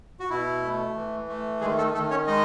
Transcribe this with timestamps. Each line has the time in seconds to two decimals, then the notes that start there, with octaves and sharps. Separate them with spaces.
0.20 F#4
0.30 B2 E4
0.63 A3
0.96 E3
1.28 A3
1.61 D#3 G#3 G#4
1.78 A3 A4
1.94 D#3 A3 A4
2.10 C#4 C#5
2.27 G#3 D#4 D#5